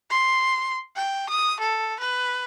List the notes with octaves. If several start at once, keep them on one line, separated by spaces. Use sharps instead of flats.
C6
G5
D#6
A4
B4